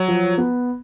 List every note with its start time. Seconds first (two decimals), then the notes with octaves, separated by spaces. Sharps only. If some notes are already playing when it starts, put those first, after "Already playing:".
Already playing: F#3
0.08 F3
0.38 B3